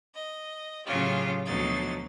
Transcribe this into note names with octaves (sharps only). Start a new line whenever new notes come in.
D#5
A2 C#3 F#3 C#4 F4 G4
D2 B2 F3 F#3 D#4 A6